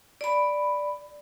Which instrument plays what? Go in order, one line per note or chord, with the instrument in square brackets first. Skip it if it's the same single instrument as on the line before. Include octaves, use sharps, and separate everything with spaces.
[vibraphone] D5 B5